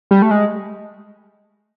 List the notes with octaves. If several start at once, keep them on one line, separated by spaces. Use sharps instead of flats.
G3
A3
G#3